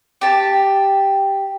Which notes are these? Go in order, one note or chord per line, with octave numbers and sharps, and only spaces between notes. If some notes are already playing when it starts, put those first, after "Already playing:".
G4 A5